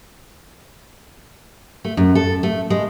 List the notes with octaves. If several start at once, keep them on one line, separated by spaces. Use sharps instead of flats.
A3
F#2
A4
A3
G#3